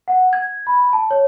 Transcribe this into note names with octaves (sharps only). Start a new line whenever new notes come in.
F#5
G#6
B5
A5
C#5